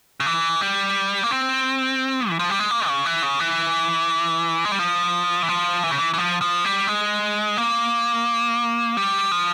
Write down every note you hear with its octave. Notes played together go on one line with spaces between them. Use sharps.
C#3
E3
G3
A#3
C4
E3
F3
G3
G#3
A#3
C#3
E3
C#3
E3
G#3
G3
F3
E3
F3
E3
C#3
E3
E3
F3
F3
G3
G#3
A#3
G3
F3